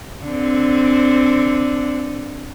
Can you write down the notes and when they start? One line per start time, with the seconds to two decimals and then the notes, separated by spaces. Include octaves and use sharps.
0.23 D3 C4